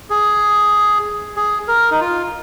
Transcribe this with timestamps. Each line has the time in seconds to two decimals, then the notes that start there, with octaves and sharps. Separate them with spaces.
0.10 G#4
1.36 G#4
1.68 A#4
1.91 D#4
2.00 F4